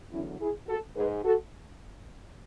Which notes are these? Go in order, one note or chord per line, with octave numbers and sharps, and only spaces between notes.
E2 D3 F#3 C#4 E4
E4 G#4
F#4 A4
G#2 G#3 G#4 B4
F#4 A4